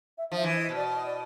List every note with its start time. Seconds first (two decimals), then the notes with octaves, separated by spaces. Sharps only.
0.18 E5
0.32 F3
0.37 E5
0.43 E3
0.56 D#5
0.69 B2
0.76 D5
0.95 D#5
1.06 D5